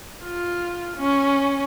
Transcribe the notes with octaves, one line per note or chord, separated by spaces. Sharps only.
F4
C#4